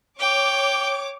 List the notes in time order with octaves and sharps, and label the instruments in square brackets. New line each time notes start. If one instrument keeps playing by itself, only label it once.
[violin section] C#5 D6 [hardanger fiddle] G5